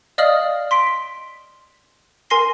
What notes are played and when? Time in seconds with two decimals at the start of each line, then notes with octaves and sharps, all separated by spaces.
0.18 D5 D#5 F5 D#6 F6 F#7
0.71 C6 B6 D7
2.30 A#4 G#5 C6 A#6 C7 G7